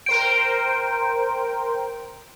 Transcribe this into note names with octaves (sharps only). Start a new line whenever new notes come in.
A#4 C5 G5 D7